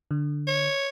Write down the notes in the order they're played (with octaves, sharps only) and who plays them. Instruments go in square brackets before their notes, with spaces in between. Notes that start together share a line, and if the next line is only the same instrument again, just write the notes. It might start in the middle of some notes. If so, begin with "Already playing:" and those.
[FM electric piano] D3
[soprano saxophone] C#5